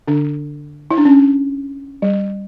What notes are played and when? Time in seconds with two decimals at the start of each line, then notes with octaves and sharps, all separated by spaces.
0.08 D3 D4
0.91 E4
0.98 D4
1.05 C#4
2.02 G3